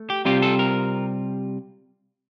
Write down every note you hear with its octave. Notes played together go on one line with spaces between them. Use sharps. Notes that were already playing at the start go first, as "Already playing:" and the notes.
Already playing: A3
G4
C3 G3 C4 F4 G4
A4
A#4